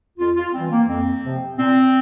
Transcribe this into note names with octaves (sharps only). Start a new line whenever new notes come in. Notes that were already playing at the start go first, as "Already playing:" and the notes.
F2 F4
F4
E3 G3 C4
A#3
F2 C4
C3 F3
A#2 C4